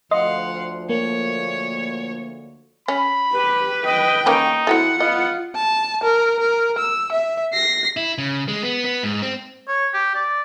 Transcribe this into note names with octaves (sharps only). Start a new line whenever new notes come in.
D2 F3 D#5 F5 F#5 C6
A#3 C#5
C#4 B5
G4 B4
D#5 G5
A#3 C#4 D#4 B4 C#6
C4 E4 F#4 A4 F#5
B3 F4 D#5
A5
A#4
A#4
E6
E5
A#6 C7
E4
C#3
G#3
B3
B3
G#2
C4
C#5
G4
D5